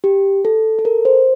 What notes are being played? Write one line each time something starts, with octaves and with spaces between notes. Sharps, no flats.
G4
A4
A4
A#4
C5